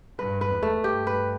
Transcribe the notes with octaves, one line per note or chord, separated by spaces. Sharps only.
G2 B4
B4
E2
A3
G2 G4
B4